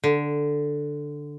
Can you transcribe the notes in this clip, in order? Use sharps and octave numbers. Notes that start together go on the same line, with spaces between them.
D3